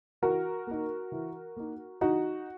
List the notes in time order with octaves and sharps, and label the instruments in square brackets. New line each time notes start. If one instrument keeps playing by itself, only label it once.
[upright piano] E3 F#4 A#4
A#3 D#4
E3
A#3 D#4
E3 D#4 F#4